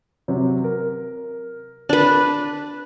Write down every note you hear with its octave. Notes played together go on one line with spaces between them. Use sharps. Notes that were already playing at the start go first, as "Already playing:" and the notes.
C3 F#3
A#4
D4 B4 A5